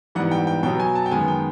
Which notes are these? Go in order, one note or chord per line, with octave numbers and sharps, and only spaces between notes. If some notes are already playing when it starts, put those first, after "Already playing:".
G#2 E3 G3 B3 F#5
G5
G5
B2 F#3 B3 G5
G#5
A5
G5
F#2 D#3 G#3 B3 G#5
G5